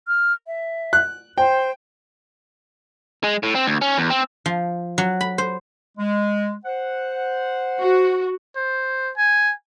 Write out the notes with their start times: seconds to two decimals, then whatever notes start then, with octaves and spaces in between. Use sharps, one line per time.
0.08 F6
0.47 E5
0.93 F#6
1.38 C5 G5
3.24 G#3
3.43 A2
3.55 C4
3.66 D2
3.81 C#4
3.98 E2
4.10 C4
4.46 F3
4.98 F#3
5.21 B5
5.38 C5
5.98 G#3
6.64 C5 F#5
7.79 F#4
8.56 C5
9.17 G#5